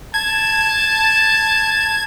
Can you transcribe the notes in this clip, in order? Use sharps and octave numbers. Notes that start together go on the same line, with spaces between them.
A5 G#6